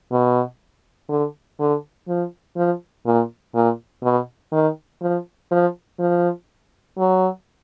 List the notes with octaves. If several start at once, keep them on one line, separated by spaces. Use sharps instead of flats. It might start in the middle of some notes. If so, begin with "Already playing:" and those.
B2
D3
D3
F3
F3
A#2
A#2
B2
D#3
F3
F3
F3
F#3